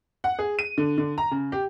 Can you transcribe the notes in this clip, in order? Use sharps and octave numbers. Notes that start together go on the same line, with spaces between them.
F#5
G#4
D#7
D3
D3
A#5
C#3
G4